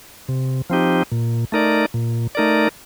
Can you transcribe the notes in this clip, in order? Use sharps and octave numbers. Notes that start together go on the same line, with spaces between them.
C3
F3 C4 D#4 G4
A#2
A3 D#4 A#4 D5
A#2
A3 D#4 A#4 D5